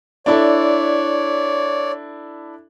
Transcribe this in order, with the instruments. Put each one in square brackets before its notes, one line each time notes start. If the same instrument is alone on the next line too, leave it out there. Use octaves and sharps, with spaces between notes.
[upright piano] D4 E4 A4 [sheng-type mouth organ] C#5 D5